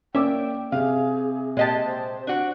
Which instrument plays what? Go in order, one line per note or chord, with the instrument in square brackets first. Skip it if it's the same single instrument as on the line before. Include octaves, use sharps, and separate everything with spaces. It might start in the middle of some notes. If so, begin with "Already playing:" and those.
[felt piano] A#3 D5 D6 [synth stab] C#4 E5 [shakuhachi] G5
[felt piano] C3 [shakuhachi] G#4 [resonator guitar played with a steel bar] F5
[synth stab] A#2 D#5 A5 [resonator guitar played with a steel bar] G#3 G4
[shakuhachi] C5
[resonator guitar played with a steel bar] D4 F#4